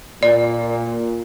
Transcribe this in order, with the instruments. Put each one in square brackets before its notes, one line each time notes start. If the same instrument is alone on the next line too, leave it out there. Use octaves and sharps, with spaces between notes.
[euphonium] A#2 [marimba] D5